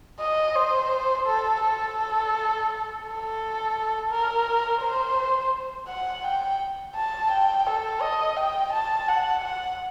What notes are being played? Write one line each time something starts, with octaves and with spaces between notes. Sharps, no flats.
D#5
C5
A4
A4
A4
A#4
C5
F#5
G5
A5
G5
A4
D#5
G5
A5
F#5
F#5